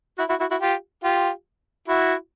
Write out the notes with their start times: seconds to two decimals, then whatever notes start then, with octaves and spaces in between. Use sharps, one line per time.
0.18 E4 F#4
0.29 E4 F#4
0.40 E4 F#4
0.51 E4 F#4
0.61 F4 G4
1.04 F4 G4
1.88 E4 F#4